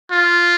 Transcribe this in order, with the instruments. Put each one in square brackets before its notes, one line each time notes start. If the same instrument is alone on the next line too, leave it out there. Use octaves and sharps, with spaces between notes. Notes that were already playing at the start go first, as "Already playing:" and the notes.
[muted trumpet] F4